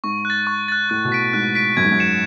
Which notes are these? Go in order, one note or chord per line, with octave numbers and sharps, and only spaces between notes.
G#2 C#6
F#6 A6
C#6
F#6 A6
A2 F#6
B2
B6 D7
G#2 F#6
B6 D7
F#2 G#6
G#2
F#2
C#7 E7